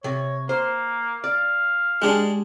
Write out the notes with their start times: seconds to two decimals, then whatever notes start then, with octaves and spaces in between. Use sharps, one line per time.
0.04 C3 C#5
0.49 A#3 C5
1.24 D5 F5
2.02 G#3 D4 G4 G#4